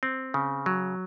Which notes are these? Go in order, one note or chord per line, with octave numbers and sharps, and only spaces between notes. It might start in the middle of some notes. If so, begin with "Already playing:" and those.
C4
C#3
F#3